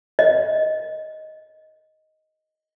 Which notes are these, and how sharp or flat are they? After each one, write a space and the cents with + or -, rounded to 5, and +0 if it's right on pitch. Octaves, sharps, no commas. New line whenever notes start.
D#5 +5